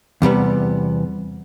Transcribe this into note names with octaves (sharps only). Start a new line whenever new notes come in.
E2 C3 G3 B3